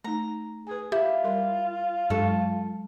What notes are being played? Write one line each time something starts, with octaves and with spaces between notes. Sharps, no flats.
A3 D#4 A#5
G#4 B4 G#5
E4 F4 G4
G3 A#4 C6
G2 F#3 G#3 A4 C#6